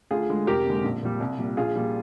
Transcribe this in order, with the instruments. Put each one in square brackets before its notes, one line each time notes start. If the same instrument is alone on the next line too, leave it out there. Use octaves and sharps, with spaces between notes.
[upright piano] D2 F4 G#4
D3 G#3
F1 G4 A#4
D#2 D3 G#3
A#1
A#2 G3
C2
A#2 G3
A#1 F4 G#4
A#2 G3